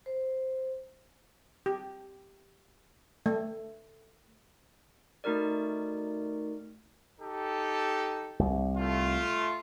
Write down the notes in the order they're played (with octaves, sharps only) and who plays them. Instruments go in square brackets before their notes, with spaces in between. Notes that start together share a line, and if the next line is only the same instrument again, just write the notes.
[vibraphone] C5
[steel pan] G4
A3
[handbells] A3 D#4 F#4 A#4 D5
[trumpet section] D#4 G4 A4
[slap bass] C2
[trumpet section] A3 F4